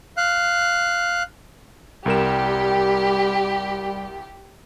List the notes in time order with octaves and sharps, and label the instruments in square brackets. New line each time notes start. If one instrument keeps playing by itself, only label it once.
[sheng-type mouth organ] F5 F#6
[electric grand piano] C2 A#4 E7 [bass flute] G3 [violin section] G4